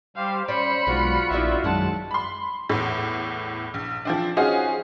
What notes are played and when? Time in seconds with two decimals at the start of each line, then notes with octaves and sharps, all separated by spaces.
0.16 G3 G4 C5 F5
0.48 C#4 C5 D5 B5 C#7
0.87 B1 G#3 D4 F4 F#4
1.31 A#1 B3 D#4 E4 D5 E5
1.64 F#2 D#3 F#3 G#3 F#5 A5
2.11 B5 C6
2.69 E2 A2
3.74 A#1
4.05 F3 C4 D4
4.37 C#4 D#4 F4 F#4 G#4 C5